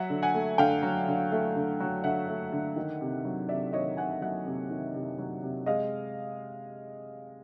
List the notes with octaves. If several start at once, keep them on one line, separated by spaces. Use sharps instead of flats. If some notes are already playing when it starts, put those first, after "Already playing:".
Already playing: F#3 E5 F#5
D3
F#5 G#5
A3
D3 F5 G5
F#3
D3
A3
D3
F#3
D3 E5 F#5
A3
D3
D#3
C3
F#3
C3 D5 E5
D#3 C#5 D#5
C3 F#5 G#5
F#3 E5 F#5
C3
D#3
C3
F#3
C3
G#3 D#5 F5